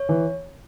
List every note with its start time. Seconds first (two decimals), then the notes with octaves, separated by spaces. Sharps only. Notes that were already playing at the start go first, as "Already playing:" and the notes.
Already playing: C#5
0.09 E3